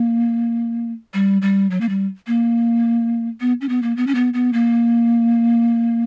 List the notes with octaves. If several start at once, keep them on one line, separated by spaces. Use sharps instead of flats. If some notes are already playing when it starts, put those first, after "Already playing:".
Already playing: A#3
G3
G3
F#3
A#3
G3
A#3
B3
C#4
B3
A#3
B3
C#4
B3
B3
A#3